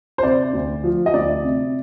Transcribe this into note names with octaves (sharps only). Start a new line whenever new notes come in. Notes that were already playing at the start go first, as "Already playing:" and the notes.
C5
C3 D5
D2
F3
D#5
D2 D5
C3